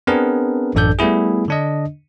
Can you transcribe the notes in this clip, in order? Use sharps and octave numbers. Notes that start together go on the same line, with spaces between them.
B3 C4 D4 G#4 A#4 B4
A1 F#2 D4 A4 D5 G6
G3 A3 B3 E4 G#4
D3 D4 D#5